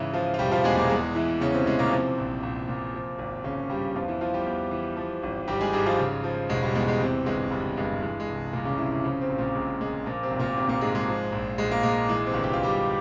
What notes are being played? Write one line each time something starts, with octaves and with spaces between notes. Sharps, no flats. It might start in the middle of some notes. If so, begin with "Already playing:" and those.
Already playing: G#2 C#3 E3 E4
F3 F4
F4
E1 G3 G4
F3 F4
E2 G#3 G#4
A#2 A#3
E2 G#3
E3 E4
E2 C#3 C#4
C3 C4
E3 G#3
A#2 A#3
C3 F3 C4
A#1
A#1
A#2
F3
G#1
G#1 C#3 C#4
G2 G3 G4
E2 F3 F4
E3 E4
E3 F3 F4
G3 G4
E2
E3
F3
G#1
G#1 G3 G4
G#3 G#4
G#2 G3 G4
F3 F4
C#3
F3
E1 G#3
G3
E2 G#3
G#3
C3 E3 C4
G1 G#3
G1 G3
G2 G#3
E3 G#3
G#3
C2
C2 A#2 A#3
C#3 C#4
C3 E3 E4
E3 E4
C#3 F3 C#4
C3 C4
A#1
A#2 A#3
A#1 G#3
A#2 G#3
A#2 F3 A#3
C3 C4
G#1
A#2 A#3
G#1 C3 C4
A#2 A#3
G#2 G#3
G#3
F3
A#1
A#1 G#3
A#3
A#2 G#3
E3 G#3
C3 C4
G1
G4
F4
G1 G3 G4